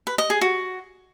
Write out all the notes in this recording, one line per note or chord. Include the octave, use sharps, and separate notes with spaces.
B4
D#5
G#4
F#4